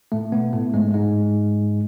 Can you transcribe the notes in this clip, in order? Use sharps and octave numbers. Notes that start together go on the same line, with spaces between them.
A2 A3
B2 B3
A2 A3
G#2 G#3
G#2 G#3